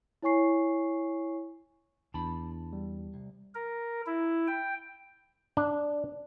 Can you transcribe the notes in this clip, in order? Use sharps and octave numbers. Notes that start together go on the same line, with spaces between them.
E4 C#5 G#5 C#6 C7
E2 D4 A5 B5
G3
C2
A#4
E4
G5
D4